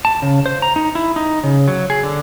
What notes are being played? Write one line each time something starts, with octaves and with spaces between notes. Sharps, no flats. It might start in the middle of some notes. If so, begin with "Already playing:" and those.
A5
C#3
C5
A#5
D#4
E4
D#4
C#3
F#3
G#4
D3